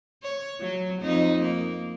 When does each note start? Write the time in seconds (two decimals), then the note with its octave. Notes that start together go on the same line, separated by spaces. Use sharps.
0.23 C#5
0.60 F#3
1.02 F2 D#4
1.42 A#3